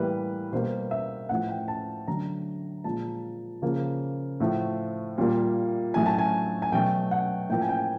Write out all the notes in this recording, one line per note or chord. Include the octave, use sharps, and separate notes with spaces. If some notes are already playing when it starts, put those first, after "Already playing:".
Already playing: A2 E3 G3 A#3 B4
B2 G3 A#3 C5
E5
A2 F3 A3 F#5
G5
A5
D3 F#3 A3 A#5
A#2 F3 G#3 A5
C#3 F3 A#3
A2 F3 A3
A#2 G3 A#3
A2 F#3 A3 G#5
A5
G#5
G#5
B2 F#3 A3 G5
F#5
A2 F3 A#3 G5
G#5
G5